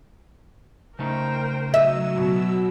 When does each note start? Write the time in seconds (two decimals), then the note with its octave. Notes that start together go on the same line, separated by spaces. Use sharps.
0.99 C#3 A3 D#4 A#4 C5 G5
1.74 F#3 D#5 E5 E6
2.14 B2